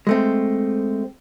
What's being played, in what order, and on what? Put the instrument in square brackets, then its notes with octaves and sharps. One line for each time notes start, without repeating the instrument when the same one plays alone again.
[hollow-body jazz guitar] G#3 A3 C4